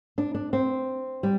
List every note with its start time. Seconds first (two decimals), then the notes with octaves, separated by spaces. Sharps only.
0.18 D4
0.35 D4
0.53 C4
1.23 G3